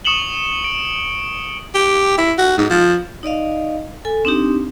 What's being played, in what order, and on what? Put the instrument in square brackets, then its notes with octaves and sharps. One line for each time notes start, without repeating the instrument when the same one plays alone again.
[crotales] C#6 D#6 C#7 E7 F#7 G7
D7
[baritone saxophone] G4
E4
F#4
G#2
F3
[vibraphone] D#4 D5 D#5 F5
A4 G#5
C4 D4 D#4 G4